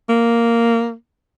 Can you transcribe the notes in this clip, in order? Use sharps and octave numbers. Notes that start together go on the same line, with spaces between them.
A#3